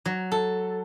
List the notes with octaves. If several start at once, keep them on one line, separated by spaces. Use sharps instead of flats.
F#3
A4